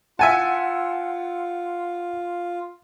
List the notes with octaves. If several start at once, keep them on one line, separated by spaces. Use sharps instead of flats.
F4 E5 F#5 G#5 A5